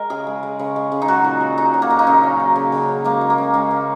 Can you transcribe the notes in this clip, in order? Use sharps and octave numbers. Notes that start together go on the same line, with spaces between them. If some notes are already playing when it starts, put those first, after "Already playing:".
Already playing: G#3 A#4
C#3 G#4
G#3
G#3
C#3
G#3
C#3
D#4
F#3 F#4
A#2
F#3
A#2 D#4
F#3
A#3
A#2
D#4
C#3 C#4
F#3
F#3
C#3
C#3
F#3
G#3 A#3
G#3
A#3
C#3
G#3 C#4
C#3